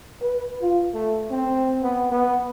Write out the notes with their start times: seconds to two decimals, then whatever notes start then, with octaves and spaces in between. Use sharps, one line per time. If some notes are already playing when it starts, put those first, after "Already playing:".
0.21 B4
0.62 F4
0.94 A3
1.31 C4
1.82 B3
2.11 B3